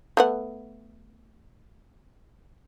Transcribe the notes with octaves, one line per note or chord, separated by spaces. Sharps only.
A3 B3 F#5